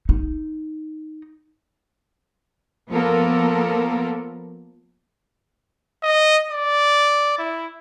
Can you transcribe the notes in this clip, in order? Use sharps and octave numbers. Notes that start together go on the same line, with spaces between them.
D#4
F3 A#3 B3 A4 A#4
D#5
D5
E4